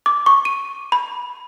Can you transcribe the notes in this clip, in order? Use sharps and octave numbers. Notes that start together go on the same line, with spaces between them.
D6
C#6
D#7
B5